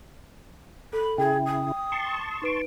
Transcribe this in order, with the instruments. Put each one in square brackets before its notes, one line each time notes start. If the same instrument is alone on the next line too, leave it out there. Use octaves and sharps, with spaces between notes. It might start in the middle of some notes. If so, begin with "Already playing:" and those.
[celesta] A4 [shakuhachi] B5
[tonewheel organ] C#3 E4 [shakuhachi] G#4 [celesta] G5
[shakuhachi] D#6
[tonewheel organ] A5 C6 C#6
[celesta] D#4 B4 D7